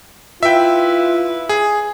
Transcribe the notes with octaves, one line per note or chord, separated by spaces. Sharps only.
E4 F4 B4 E5 G5
G#4